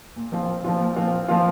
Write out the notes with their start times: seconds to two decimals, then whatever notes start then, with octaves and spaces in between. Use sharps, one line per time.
0.16 A#2
0.32 F3 C4 F4
0.48 A#2
0.64 F3 C4 F4
0.80 A#2
0.96 F3 C4 F4
1.12 A#2
1.28 F3 C4 F4